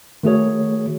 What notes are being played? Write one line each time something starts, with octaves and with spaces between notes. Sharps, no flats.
D#3 A3 F#4 G#4 C#5